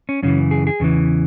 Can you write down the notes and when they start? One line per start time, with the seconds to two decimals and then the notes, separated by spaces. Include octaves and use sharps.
0.09 C#4
0.23 F#2 C#3 E3 C#4
0.51 G#4
0.67 G#4
0.80 E2 C#3 E3